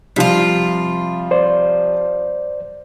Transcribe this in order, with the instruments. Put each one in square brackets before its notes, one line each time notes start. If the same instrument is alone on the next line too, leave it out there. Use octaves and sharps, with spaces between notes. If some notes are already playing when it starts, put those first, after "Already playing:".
[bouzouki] C3 F4 [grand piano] F3 G3
[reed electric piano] C5 D5